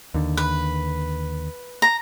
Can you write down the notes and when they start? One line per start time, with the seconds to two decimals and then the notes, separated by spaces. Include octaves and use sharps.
0.14 D#2 D3
0.37 B4
1.82 A#5